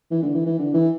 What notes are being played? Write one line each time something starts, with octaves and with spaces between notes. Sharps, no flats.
E3
D3
E3
E3
D3
E3